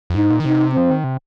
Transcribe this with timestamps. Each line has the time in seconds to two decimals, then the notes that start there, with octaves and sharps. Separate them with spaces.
0.10 F2
0.15 G#2 D#4
0.30 A#2
0.40 D#3
0.45 C3 D#4
0.74 F3 C4
0.90 D#3
1.04 C3